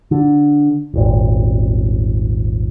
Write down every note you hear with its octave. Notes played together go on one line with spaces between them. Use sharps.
D3
D#1 G#1